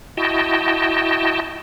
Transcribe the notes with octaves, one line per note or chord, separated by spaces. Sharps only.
E4 F#4 D#5 G5 A5